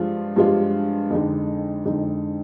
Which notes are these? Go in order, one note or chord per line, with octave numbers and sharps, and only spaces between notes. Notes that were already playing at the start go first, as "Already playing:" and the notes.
Already playing: G2 F3 G#3 D4 F4
G2 F3 G#3 D4 F4
F2 D3 G#3 D#4
F2 D3 G#3 D#4